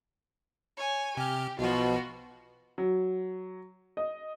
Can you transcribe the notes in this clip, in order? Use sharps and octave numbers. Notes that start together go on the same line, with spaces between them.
C#5 G#5
C3 G4 F6
B1 B2 F3 F4 F#4
F#3
D#5